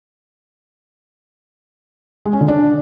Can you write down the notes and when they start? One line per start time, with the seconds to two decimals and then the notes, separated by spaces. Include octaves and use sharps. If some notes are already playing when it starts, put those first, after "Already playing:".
2.25 G#3
2.33 C#4
2.41 D3
2.48 D4